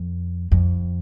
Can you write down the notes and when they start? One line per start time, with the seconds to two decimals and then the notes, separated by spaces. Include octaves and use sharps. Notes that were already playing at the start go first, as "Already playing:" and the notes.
Already playing: F2
0.52 F2